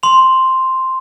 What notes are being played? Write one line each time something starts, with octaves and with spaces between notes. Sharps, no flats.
C6 F7